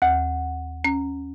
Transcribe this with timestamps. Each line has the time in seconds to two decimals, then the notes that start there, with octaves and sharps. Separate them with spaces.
0.02 D#2 F#5
0.84 C#4